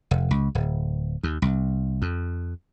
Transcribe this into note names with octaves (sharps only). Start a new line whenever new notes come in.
F1
C#2
D1
D#2
C2
F2